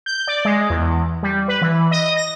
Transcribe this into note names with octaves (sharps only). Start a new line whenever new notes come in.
G6
D5
G#3
E2
G3
B4
E3
D#5
A#6